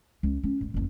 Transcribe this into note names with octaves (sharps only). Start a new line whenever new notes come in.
C#2
C#4
G1 D2
F#1 E2